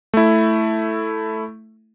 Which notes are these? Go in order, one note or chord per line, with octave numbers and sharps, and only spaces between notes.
A3 E4